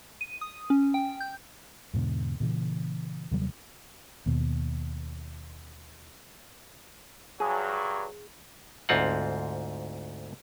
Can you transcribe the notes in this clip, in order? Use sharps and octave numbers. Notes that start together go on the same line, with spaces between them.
D#7
D#6
C#4
G5
G6
E2 G#2 B2 D3
A#2 C#3 E3
D#2 C3 F#3 G3
D#2 B2
G2 F#3 G#4
D2 G#2 C4 F4 F#5